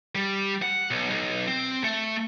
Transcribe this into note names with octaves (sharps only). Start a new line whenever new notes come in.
G3
F#5
B1
B1
C4
A3